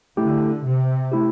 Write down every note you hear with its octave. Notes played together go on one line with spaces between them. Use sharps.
D3 A3 E4 G4
C3
A3 E4 G4